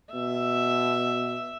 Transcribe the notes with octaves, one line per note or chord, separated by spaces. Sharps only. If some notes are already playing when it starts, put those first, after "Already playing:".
B2 E5